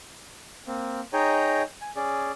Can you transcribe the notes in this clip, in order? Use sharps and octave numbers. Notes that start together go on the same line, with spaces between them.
A#3 C4
D#4 G#4 C#5 D#5 G5 A#5
G#5
C#4 G#4 D5